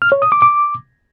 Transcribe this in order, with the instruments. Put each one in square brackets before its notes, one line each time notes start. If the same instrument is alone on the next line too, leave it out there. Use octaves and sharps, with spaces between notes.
[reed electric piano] F6
C#5
D#6
D6
D6